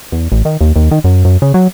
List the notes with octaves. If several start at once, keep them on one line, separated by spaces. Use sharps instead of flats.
E2
A1
D#3
D#2
D#2
D#3
F#2
F#2
C#3
F#3